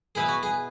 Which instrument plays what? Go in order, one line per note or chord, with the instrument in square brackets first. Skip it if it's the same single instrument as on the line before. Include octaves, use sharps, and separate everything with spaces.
[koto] B2 B3 E4 B4 [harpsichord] G#4
[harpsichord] F#4
G#4